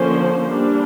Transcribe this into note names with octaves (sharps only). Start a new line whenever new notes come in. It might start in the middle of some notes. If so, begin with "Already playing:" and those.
Already playing: D3 F3 A#3 C#4 C5
G3 A#3 D4